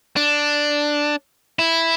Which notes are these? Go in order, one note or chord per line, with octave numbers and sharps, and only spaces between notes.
D4
E4